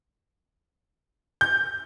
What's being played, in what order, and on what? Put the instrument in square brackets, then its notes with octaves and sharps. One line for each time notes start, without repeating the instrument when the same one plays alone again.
[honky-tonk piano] G6